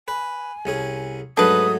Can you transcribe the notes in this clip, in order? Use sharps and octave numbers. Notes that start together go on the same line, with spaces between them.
B4 G#5
C2 C#4 G#4
G#2 F#3 A3 D4 B4 D#6